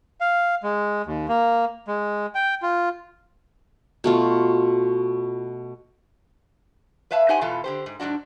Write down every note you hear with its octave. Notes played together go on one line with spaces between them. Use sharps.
F5
G#3
D#2
A#3
G#3
G5
F4
B2 A3 F4
B4 C#5 E5 F5 A5
D#4 G4 C5 F#5 G#5
E2 B2 E3 F4 A4
D3 G4 C5
G#2
G#2 C3 F#3 D4 F#4